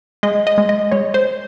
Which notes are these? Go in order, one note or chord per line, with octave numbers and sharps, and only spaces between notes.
G#3 D#5
D#5
G#3
D#5
G#3 C#5
C5